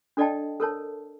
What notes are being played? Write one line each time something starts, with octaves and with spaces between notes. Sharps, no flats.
D4 A4 D5 D#5 G5 A5
A4 A#4 C#5 A5